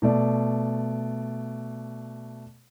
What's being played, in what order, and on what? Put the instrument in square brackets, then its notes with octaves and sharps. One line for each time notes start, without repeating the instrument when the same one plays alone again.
[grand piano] B2 A3 D5